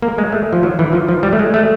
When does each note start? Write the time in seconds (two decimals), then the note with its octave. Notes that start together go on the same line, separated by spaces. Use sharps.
0.02 A#3
0.18 G#3
0.32 A3
0.53 F3
0.63 F#3
0.79 E3
0.93 F3
1.08 F3
1.23 G3
1.33 A3
1.39 G#3
1.54 A3